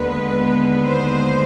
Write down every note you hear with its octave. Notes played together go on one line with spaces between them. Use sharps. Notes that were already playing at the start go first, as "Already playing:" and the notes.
Already playing: D#2 D3 G#3 B3 B4
C5